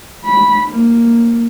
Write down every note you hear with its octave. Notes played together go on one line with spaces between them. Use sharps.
B5
A#3